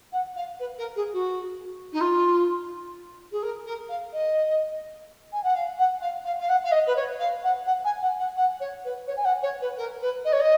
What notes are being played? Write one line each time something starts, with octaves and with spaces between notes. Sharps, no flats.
F#5
F5
B4
A#4
G#4
F#4
D#4
F4
G#4
A#4
A#4
F5
D#5
G#5
F#5
F5
F#5
F5
F5
F5
F#5
F5
D#5
B4
C#5
F5
F#5
F#5
G#5
F#5
F#5
F#5
C#5
B4
C#5
G#5
F#5
C#5
B4
A#4
B4
D#5
C#5
D#5